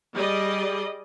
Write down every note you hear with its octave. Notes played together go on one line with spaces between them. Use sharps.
G3 G#4 D5 D#5